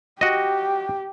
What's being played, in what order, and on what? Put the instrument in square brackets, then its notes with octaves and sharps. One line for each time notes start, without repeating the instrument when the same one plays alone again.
[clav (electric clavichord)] F#4 D#5 [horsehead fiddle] G4